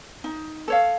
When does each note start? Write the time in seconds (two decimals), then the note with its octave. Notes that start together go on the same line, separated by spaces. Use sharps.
0.24 D#4
0.68 A4 C#5 F5